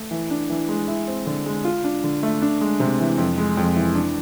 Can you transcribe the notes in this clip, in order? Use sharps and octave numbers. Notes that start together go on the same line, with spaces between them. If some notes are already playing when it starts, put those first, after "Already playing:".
Already playing: A3
E3
D4
E3
G#3
E4
C4
D3
G#3
F4
D4
D3
A3
D4
G#3
C3
E3
F2
G#3
F2
E3
D4